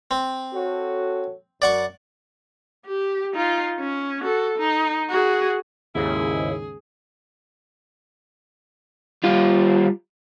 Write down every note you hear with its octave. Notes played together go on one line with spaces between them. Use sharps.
C4
F#4 A4 C#5
F#2 D5 F#5 C#6
G4
D#4 F4
C#4
F#4 A4
D#4
F#4 G#4
D#2 G#2 C#3 E4 G#4
G3 F4